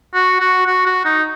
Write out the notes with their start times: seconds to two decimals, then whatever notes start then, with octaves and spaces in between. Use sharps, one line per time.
0.14 F#4
0.40 F#4
0.66 F#4
0.86 F#4
1.05 D#4